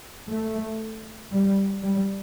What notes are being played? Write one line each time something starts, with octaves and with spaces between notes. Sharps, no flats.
A3
G3
G3